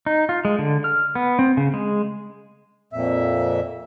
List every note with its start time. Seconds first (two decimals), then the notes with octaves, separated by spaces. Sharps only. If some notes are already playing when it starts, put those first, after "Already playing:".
0.06 D#4
0.29 F4
0.45 G#3
0.59 D3
0.84 F6
1.15 B3
1.39 C4
1.57 C#3
1.74 G#3
2.93 F2 A#2 E5